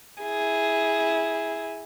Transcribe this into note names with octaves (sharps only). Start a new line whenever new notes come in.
E4 G#4